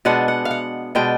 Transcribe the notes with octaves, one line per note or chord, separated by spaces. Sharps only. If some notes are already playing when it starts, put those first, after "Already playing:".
B2 G#3 B3 D4 F#5
F#5
F5
F#5
B2 G#3 B3 D4 G5